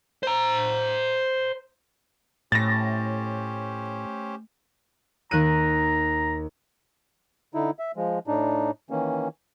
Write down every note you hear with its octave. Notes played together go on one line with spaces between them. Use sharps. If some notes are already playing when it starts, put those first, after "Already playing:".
C5 A#5
A2 A3 C#4 G4 C5 A6 A#6
D#2 A#5 F#6 D#7
D3 D#4 E4
E5
F3 G#3
A2 D4 D#4
D#3 E3 A#3 C#4